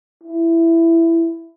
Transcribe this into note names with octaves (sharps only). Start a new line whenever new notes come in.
E4